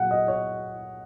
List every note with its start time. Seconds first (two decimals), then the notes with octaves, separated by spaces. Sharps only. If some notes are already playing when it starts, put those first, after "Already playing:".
Already playing: A#2 F#3 F#5
0.11 D#5
0.28 C#5